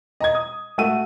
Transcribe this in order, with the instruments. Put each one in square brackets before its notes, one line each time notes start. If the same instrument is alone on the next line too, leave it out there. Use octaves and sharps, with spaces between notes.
[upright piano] D#5 A#5 G#6
D#6
A3 F#4 E6 D#7